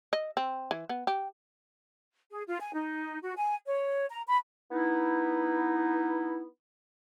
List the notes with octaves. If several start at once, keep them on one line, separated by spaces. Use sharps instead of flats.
D#5
C4
E3
B3
G4
G#4
F4
G#5
D#4
F#4
G#5
C#5
A#5
B5
B3 D#4 E4